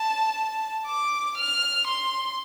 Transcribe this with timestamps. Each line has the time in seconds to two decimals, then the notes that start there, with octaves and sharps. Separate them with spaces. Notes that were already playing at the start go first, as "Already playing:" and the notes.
Already playing: A5
0.87 D6
1.37 F6
1.87 C6